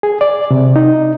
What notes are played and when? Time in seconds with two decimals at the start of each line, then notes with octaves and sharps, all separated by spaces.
0.03 G#4
0.21 D5
0.51 C3
0.76 D#4